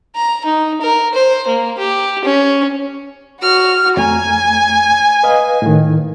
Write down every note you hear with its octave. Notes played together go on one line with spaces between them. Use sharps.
A#5
D#4
A#4
C5
A#3
G4
C#4
F#4 F6
F2 A3 G#5 A#5
B4 D#5 F5
A2 D#3